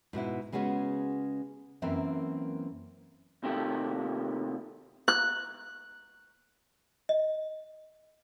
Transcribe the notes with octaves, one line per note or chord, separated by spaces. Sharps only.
G#2 B2 B3 E4
C#3 G#3 B3 C#4 F#4
F#2 E3 A#3 C4 E5
C3 D#3 A3 G4
F#6
D#5